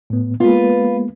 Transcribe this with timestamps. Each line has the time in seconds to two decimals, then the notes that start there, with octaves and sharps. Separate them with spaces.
0.10 A2 B3
0.40 G#3 A#3 B3 F4 B4